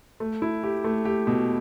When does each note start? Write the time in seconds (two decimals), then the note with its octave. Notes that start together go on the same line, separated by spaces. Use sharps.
0.20 A3
0.42 E4
0.63 G4
0.84 A3
1.05 G4
1.27 B2